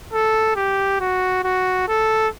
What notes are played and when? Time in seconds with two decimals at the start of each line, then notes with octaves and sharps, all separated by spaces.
0.13 A4
0.56 G4
1.01 F#4
1.44 F#4
1.88 A4